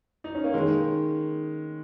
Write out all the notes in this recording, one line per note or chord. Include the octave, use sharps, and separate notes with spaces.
D#4
C#4
A#3
D#3 G#3